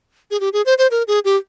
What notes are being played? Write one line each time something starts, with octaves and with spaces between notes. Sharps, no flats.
G#4
G4
G#4
C5
C5
A#4
G#4
G4